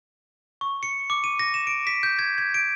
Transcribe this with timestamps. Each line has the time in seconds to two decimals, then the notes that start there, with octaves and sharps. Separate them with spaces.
0.61 C#6
0.83 C#7
1.10 D6
1.24 D#7
1.39 A#6
1.54 E7
1.67 D7
1.87 B6
2.03 G6
2.19 G#6
2.38 G#6
2.54 D7